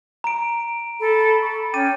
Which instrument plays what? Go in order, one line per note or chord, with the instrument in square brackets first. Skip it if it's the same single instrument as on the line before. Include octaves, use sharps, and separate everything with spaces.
[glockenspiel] A#5 D7
[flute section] A4 B5
[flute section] B5 [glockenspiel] C#6
[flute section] C#4 G5 [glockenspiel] D6 A6 D#7